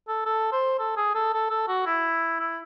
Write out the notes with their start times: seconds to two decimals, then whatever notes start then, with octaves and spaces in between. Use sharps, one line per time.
0.08 A4
0.26 A4
0.52 C5
0.79 A4
0.97 G#4
1.15 A4
1.33 A4
1.51 A4
1.68 F#4
1.86 E4
2.40 E4